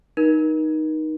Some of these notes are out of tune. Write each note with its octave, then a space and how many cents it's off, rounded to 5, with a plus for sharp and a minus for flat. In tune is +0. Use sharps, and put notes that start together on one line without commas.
D#4 +0 A#4 +35